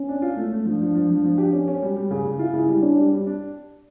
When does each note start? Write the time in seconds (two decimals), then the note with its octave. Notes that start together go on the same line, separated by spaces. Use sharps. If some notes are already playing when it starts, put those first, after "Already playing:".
Already playing: C#4
0.09 D4
0.22 F4
0.36 A3
0.52 A3
0.65 F3 D4
0.81 F3
0.95 F3
1.10 F3
1.24 F3
1.38 G4
1.53 C#4
1.68 C#4
1.82 G3
1.96 G3
2.11 C#3
2.25 C#3
2.39 E4 F4
2.53 C#3
2.68 G3
2.82 C#4 D4
2.98 G3
3.12 G3
3.27 D4